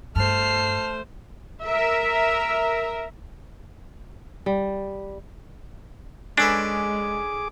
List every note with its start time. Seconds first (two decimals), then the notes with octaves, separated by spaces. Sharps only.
0.16 G2 A3 C5 A5 F6 C7
1.64 A#4 E5
4.46 G3
6.38 G#3 C#4 D4 G#4 A4 B4 D6